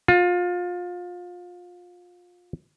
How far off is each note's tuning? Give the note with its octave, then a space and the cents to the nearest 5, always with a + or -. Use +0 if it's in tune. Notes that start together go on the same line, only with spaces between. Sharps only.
F4 +25